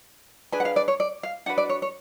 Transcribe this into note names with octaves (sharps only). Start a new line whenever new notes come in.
D4 G#4 B4 G#5
F#5
F5
D5
C#5
D5
F5
D4 F#4 B4 F#5
D5
C#5
C#5